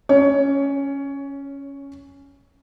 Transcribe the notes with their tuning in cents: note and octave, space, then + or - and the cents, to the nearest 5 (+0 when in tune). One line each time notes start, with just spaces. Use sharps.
C#4 +0 C#5 +20